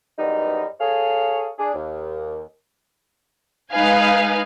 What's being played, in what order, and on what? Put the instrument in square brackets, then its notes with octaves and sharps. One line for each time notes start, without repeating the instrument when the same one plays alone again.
[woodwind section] F#2 E3 G3 G#3 B3 D#4
G#4 A4 C#5 F5
D4 G#4
D#2
[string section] G#3 D#4 B4 F5 G#5